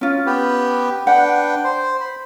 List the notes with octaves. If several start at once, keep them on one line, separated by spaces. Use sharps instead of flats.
C#4 F4
B3 G4 B4
D4 B4 F#5 G5
C5
B5